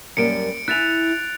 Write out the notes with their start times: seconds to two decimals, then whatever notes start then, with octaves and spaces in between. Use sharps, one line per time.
0.17 F#2 G3 A#3 C#7 D7
0.68 E4 G#5 F#6 A6 F7